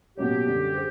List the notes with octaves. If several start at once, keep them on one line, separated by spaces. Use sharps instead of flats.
B2 F#3 A#3 C#4 G4
F#2 D3 G3
G#4 C5